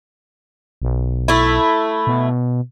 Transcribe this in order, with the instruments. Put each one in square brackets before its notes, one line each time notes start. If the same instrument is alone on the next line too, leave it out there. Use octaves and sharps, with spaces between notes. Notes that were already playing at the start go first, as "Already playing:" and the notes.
[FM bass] B1
[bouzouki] A3 E4
[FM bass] B2